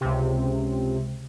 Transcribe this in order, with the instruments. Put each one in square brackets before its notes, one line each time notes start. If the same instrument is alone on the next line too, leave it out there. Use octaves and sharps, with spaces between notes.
[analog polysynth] C#2 C3